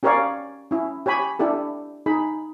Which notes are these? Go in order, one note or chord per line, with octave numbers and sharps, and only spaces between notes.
C#4 G4 A#4 C#5 D5 F5
C#4 E4
G4 C#5 G#5 B5
D4 E4 G4 A4
D#4 G#4 B5